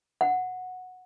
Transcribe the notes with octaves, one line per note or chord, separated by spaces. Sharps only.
F#5